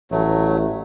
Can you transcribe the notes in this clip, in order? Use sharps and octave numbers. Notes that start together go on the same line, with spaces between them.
A1 F#3 A3